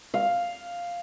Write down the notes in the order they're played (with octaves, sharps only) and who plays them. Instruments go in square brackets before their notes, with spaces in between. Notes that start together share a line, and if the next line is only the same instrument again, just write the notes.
[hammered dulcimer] F5